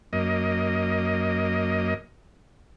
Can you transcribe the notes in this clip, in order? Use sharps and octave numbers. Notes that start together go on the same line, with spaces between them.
F#2 A#3 D#5